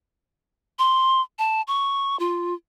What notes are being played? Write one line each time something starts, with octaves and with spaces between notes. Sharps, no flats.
C6
A5
C#6
F4